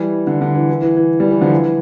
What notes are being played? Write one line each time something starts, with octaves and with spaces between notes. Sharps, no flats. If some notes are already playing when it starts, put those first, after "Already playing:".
Already playing: E3 G3
D3
D3
E3
E3
E3
E3
E3 G3
E3
D3 F3
E3